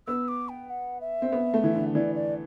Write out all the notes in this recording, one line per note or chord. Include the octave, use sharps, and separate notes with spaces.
B3 E6
D6
G5
F#5
E5
C4
B3
A3
E3
D3
E3 D5
D5